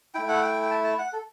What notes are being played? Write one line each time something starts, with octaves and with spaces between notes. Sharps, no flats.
A3 E4 G5
F#5
G5
G5
A5
A5
F#5
A4